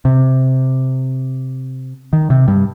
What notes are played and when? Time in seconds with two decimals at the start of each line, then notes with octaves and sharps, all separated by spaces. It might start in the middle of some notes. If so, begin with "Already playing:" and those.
0.05 C3
2.13 D#3
2.30 C3
2.48 G2